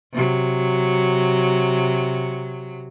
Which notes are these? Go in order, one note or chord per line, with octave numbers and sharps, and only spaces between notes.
C3 F#3